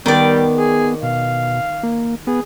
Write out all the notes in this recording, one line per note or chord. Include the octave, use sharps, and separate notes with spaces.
D#3 G3 B3 D5
G#4
B2 F5
A#3
B3 G#4